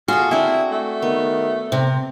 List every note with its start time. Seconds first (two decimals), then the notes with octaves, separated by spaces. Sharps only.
0.08 F4 F#4 G#4 A4
0.31 C4 D4 E4
0.72 A3
1.02 D#3 B3
1.72 C3 C4